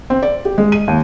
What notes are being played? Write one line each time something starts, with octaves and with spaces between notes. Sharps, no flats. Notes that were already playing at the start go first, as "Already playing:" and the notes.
C4
D5
G4
G#3
D#7
D#2